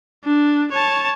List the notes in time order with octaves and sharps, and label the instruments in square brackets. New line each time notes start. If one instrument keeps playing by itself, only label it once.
[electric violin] D4
C#5 A5